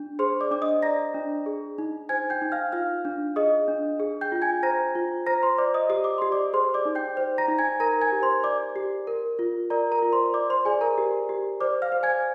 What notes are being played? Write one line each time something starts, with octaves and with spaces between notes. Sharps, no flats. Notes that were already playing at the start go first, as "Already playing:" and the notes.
Already playing: D4
G#4 C5 C6
D5 D6
D4 D6
D#5 D#6
D5 A#5 A#6
D4
G#4
D#4
C5 G#5 G#6
G5 G6
D#4
F5 F6
F4 F5 F6
D4
G#4 D#5 D#6
D4
G#4
G5 G6
F4
G#5 G#6
C5 A#5 A#6
F4
C5 A#5 A#6
C5 C6
C5 D5 D6
D#5 D#6
G4 D#6
D6
G4 C6
D5 D6
G#4 C5 C6
D5 D6
D#4
G5 G6
C5
A#5 A#6
D#4
G#5 G#6
A#4 A#5 A#6
G#5 G#6
G4
C5 C6
D5 D6
G4
A#4
F4
A#4 D5 A#5
A#4 A#5
F4
C5 C6
D5 D6
C5 C6
G#4 D5 G#5
A#4 A#5
G4
G4
C5 D5 D6
F5 F6
C5
G#5 G#6